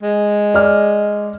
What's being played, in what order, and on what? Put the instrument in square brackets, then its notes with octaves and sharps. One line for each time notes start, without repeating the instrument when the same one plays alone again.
[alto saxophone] G#3
[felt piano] D5 F6